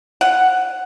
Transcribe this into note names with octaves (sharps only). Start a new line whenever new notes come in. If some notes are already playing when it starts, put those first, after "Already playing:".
F#5